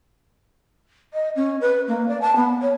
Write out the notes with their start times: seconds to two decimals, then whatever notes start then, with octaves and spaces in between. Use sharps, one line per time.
1.13 D#5
1.36 C#4
1.61 B4
1.88 A#3
2.08 D5
2.21 A5
2.36 B3
2.62 C#5